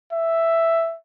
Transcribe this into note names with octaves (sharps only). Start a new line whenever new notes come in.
E5